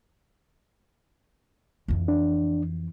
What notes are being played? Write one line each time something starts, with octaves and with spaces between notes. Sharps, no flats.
F2 E3
D4